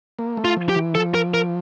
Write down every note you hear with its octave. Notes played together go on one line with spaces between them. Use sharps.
A#3
A3
F4
F3
G4
E3
F3 A4
A#4
A#4